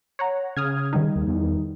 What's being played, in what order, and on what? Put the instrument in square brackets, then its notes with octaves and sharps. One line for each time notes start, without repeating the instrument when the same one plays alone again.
[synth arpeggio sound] C#5 F#5 A#5
[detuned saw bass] C#3 [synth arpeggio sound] D#6 F6 G#6
[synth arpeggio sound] D#3 G3 D#4
[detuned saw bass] D#2
E2